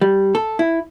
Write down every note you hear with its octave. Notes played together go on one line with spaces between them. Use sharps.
G3
A4
E4